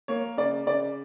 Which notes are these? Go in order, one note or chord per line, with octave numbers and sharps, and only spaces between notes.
A#3 C#5
C#3 D5
C#3 D5